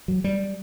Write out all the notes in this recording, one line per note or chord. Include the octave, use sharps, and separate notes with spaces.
F#3
G3